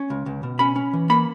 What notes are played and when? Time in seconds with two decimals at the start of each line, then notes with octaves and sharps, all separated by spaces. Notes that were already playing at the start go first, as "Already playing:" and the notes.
Already playing: C#4
0.10 C#2
0.26 C#2
0.43 B2
0.59 C#4 B5
0.76 C#4
0.93 E3
1.10 A#3 B5